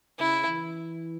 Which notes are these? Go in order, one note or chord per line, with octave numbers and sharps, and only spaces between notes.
C#3 E4
E3